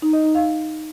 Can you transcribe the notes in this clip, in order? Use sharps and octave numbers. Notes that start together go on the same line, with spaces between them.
D#4
D#5
D#4
F5